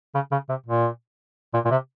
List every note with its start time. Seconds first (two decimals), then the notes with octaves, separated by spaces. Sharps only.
0.14 C#3
0.31 C#3
0.49 C3
0.66 A#2
1.54 A#2
1.65 A#2
1.71 C3